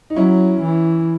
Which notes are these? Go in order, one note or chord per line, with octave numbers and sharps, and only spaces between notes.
D#4
F#3 C#4 E4
E3